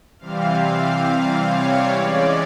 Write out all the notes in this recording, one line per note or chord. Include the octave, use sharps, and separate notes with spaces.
C3 E3 G3 C4 F5
F5
C#5
E3 G#3 C#4 D5